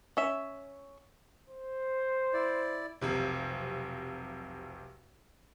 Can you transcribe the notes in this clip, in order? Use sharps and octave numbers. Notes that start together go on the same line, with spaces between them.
C#4 E5
C5
E4 D5
F1 B1 C3